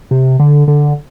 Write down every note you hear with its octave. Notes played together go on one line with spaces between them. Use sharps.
C3
D3
D3